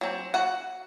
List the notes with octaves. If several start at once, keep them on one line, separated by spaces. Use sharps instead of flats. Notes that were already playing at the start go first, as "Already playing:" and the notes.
F#3 C4
F#4 F#5